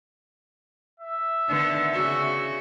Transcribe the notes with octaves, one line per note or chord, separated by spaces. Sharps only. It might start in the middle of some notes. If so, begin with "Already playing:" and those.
E5
D3 D#3 B3
C#3 F#4